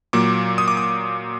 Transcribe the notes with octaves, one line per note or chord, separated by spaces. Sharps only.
A#2 F#3 A#3 D6
D#6
D6
D#6